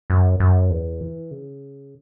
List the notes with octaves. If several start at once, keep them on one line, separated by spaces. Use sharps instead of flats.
F#2
F#2
E2
E3
C#3